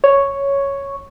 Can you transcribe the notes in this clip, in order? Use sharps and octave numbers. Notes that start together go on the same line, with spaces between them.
C#5